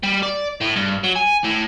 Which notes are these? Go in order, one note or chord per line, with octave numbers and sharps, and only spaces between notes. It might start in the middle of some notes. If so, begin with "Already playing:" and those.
G3
D5
A2
G2
F#3
G#5
A2